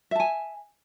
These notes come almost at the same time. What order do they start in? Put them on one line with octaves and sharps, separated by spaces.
E5 A5 G#5